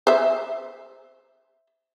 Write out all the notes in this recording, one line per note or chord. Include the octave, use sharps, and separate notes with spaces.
C5 E5